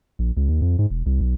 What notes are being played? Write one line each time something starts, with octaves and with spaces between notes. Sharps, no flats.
A#1
C#2
D#2
F2
G#2
E1
C2
B1